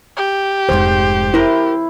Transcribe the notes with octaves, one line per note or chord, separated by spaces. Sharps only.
G4
F1 D2 G#2 C5
E4 A#4 C5